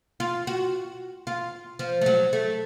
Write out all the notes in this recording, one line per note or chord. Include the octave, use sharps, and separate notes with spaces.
F4
F#4
F4
F3
A3
F#3
A3